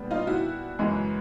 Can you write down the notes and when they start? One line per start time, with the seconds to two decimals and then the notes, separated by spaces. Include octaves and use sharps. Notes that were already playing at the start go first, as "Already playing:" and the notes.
Already playing: A#2 G3 B3 D4
0.11 D#4 F4
0.27 E4 F#4
0.79 F#2 C#3 E3 G#3